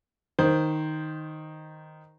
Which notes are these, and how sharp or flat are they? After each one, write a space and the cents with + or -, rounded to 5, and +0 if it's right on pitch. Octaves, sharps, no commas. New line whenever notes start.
D#3 +0 C5 +0